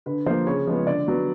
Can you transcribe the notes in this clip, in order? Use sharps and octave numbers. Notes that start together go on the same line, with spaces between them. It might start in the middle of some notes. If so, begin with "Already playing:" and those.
D3 B4
F3 A#3 C5
C#3 C#5
F3 G#3 B3
D3 D5
F#3 B3